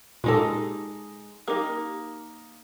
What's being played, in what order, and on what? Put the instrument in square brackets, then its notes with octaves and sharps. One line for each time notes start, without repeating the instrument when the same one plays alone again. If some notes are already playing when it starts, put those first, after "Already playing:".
[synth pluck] A#2 G4 A4 [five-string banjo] G#3 D#4 A5
[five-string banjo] A#3 D#4 [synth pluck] G4